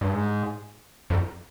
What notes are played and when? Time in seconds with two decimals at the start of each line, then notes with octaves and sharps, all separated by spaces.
0.01 G2
0.13 G#2
1.10 F2